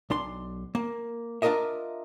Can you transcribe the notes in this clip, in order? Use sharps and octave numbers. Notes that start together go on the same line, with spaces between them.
B1 D4 C6
A#3
D4 F4 G4 A#4 D#5 E5